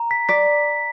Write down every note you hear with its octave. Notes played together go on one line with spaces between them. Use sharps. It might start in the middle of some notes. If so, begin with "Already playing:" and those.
Already playing: A#5
B6
D5 B6